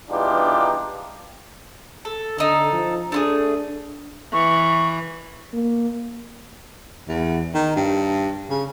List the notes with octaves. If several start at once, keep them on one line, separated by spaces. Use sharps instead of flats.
E2 G2 D4 D#4 F4 G4
A4
D3 D#4 A4
F3
A3 D4 F4 G#4
E3 C#6
A#3
E2
D#3
G2
C#3